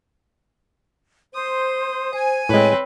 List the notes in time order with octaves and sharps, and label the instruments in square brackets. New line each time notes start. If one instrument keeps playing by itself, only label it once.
[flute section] C5 [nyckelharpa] D#6
[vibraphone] C5 [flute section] G#5
[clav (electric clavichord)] A2 G#3 [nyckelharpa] C4 B4 [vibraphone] C#5